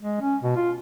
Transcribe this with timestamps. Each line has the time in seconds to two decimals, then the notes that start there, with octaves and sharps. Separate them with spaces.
0.02 G#3
0.21 C#4
0.43 B2
0.56 F4